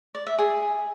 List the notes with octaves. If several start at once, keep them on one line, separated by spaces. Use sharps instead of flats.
D5
E5
G#4